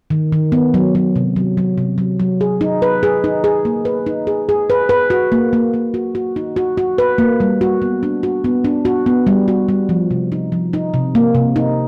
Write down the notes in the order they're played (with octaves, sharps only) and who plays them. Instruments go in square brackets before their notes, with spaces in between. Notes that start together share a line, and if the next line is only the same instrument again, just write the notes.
[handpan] D#3
D#3
B3
F#3
F#3
C3
F#3
F#3
C3
F#3
F#3
G#4
D#4
B4
G#4
D#4
G#4
A#3
B4
D#4
G#4
G#4
B4
B4
F#4
A#3
A#3
A#3
F#4
F#4
D#4
F#4
F#4
B4
A#3
G3
F#4
B3
D4
F#4
B3
D4
F#4
B3
G3
F#4
G3
F3
C3
D#4
F3
D#4
C3
A#3
C3
D#4